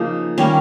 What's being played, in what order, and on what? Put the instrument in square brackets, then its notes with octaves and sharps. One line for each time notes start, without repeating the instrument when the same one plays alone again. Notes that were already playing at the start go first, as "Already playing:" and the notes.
Already playing: [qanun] C#3 F3 A#3 D#4
D#3 G3 A#3 C#4